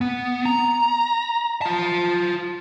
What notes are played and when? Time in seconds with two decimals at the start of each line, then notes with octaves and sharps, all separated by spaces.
0.01 B3
0.45 A#5
1.62 F4 A5